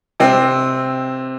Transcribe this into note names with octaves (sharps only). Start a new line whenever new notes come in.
C3 C4